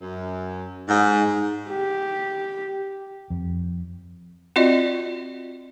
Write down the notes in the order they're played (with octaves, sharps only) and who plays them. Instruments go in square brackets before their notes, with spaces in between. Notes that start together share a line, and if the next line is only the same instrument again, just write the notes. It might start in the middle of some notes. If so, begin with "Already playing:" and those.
[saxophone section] F#2
G#2
[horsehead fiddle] G4
[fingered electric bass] F2
[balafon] C4 F4 F#4 D5 D#5